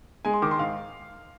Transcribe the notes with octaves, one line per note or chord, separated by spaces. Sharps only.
G#3 G#5
C6
D#3 D6
C6
G#2 F5